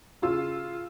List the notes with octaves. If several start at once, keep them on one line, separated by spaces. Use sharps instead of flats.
C#3 F4 E6